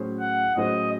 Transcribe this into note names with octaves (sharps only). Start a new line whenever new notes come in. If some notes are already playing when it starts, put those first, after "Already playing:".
Already playing: A2 F#3 C#4 G#4 C5
F#5
A2 F#3 C#4 G#4 C5 D#5